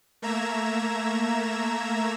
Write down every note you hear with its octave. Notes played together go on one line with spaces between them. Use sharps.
A3 A#3 E5 A#5 G#6 E7